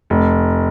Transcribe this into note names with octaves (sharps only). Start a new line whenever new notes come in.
F1